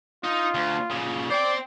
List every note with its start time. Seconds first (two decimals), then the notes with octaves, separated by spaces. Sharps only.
0.24 D#4 F4
0.54 D2
0.90 A#2 C#3
1.30 C5 D5 G5